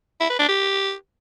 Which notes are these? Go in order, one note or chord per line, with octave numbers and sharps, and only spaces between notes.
E4
B4
D4
G4